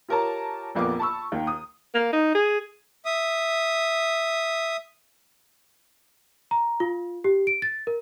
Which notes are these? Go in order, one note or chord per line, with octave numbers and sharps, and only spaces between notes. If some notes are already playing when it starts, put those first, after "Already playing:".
F4 G4 A#4 C#5 A5 A#5
A#1 F2 A#3 B3 A#4 D6
A5 B5 C#6 E6
D#2 D#3
D#6
A#3
D#4
G#4
E5 D#6
A#5
F4
G4
D7
A6
A#4